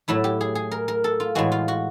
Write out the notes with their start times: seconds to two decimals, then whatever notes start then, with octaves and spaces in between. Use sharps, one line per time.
0.08 A2 F#3 A3 E4
0.24 G4
0.41 G#4
0.55 G#4
0.72 A#4
0.88 A#4
1.04 A4
1.20 F4
1.35 A2 E3 G#3 F#4
1.52 F4
1.68 F#4